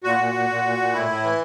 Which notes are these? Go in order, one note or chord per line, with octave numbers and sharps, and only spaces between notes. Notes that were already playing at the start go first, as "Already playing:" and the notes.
A#2 F#4
A#2
A#2
A#2
A#2
A#2
A2 E4
A2
E3